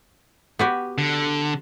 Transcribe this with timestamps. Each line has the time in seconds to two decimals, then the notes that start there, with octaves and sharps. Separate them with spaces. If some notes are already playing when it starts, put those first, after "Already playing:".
0.59 B3 F#4 G4
0.98 D3